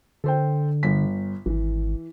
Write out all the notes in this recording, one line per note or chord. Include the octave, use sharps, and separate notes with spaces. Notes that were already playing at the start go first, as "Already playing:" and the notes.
D3 A4 C5 G5
G1 B6
G#1 E3